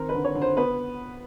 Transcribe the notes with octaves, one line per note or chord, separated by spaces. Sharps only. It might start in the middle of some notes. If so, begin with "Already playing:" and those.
Already playing: D#3 C4 A#4
B4
D3
C#5
D3
C5
B3 B4